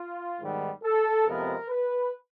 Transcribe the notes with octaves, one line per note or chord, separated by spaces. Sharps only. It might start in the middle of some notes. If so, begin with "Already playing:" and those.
Already playing: F4
G#2 D#3 G3 B3
A4
F2 C3 F3 G#3 B3 A#4
B4